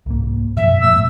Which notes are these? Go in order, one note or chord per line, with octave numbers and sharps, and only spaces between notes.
C2 G#2 A#3
F#2 B2 F3 E5
A#2 A3 E6
F1 G#2 B2